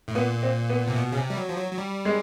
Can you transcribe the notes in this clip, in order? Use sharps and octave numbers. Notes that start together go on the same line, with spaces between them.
A2
A#2 B3
C4
B3
C3
B2
C#3
C3
G3
F#3
F3
F#3
F#3
G3
G#3